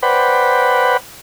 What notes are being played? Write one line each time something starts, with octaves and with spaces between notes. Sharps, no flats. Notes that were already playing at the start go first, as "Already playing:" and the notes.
B4 C5 D5 F#5 G5 B5